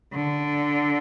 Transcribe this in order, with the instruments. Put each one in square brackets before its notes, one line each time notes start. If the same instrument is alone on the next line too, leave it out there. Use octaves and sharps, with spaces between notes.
[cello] D3